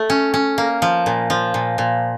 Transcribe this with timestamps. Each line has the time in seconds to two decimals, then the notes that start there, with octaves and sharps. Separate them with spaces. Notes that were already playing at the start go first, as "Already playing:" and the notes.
Already playing: A3
0.10 C#4
0.34 C#4
0.58 A#3
0.82 F3
1.06 A#2
1.30 F3
1.54 A#2
1.78 A#2